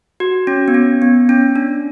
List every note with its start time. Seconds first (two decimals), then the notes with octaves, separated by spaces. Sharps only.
0.20 F#4
0.47 C#4
0.68 B3
0.74 C#4
1.02 B3
1.29 C#4
1.56 D4